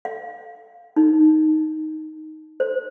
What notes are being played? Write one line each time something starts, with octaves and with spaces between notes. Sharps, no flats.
F5
D#4
C5